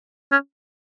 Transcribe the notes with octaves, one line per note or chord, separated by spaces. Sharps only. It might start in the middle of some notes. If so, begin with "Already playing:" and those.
C#4